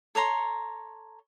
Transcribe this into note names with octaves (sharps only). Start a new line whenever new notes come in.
A4 C#5 A#5 C6